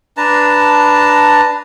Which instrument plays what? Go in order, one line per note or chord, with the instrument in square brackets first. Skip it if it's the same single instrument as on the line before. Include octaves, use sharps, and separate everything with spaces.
[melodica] D4 B4 A5 A#5